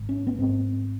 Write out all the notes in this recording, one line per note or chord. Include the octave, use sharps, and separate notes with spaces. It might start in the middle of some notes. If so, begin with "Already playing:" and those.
Already playing: G#1
C#4
B3
G#2 C4